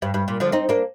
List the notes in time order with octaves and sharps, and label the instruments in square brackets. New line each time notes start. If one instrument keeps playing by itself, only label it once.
[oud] G2
G2
A#2
D3 F3
C4 D#4
A#3 D4